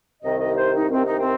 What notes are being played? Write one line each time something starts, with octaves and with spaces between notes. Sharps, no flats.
C2 C3 D#3 D#5
D#5
C5
D#4
C2 C3 D#3 C4
D#4
C4